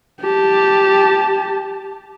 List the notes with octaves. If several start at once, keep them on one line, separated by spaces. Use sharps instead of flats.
G4 A5